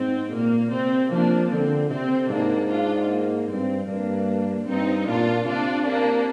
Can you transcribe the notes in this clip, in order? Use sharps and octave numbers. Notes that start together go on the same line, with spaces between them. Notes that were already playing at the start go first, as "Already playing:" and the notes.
Already playing: G#2 C4
A#2 A#3
C3 C4
F3 A#3 D4
D3 C4
C3 C4
G#2 A#3 D4
D4 F4
A#3
G2 C4
G2 A#3 D4
G2 C4 D#4
A#2 D4 F4
C3 D4 F4
A#3 D4